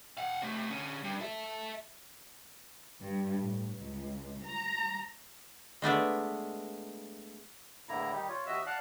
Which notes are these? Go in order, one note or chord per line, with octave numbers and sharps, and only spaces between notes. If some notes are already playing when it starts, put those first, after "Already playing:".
F5 F#5
C3 A3
D3 C#4
G2
A4 E5
G2
A2
C#2
A#5
G#3 A3 B3 D4
E2 A2 D3 A#3 E4 A#5
D#3 G3 D#4 G4
F4 C#5
D#2 F#4 D#5 E5 E6
D5 F5 F#5 A5 F#6